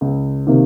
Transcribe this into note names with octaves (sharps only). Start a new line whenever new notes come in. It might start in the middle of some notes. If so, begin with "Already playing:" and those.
C#2
C3 D#3 A#3